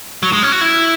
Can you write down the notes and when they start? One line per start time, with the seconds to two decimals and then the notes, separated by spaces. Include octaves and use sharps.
0.23 F#3
0.33 G#3
0.43 C#4
0.52 F#4
0.61 E4